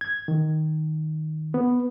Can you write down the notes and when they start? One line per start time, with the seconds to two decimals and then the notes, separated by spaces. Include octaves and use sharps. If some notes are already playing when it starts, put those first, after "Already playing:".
0.01 G#6
0.28 D#3
1.54 B3